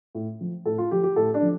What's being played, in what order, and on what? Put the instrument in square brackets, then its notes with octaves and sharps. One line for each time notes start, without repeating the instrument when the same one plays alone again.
[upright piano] A2
F3
A2 A4
F4
F3 G4
G4
A2 A4
D4
F3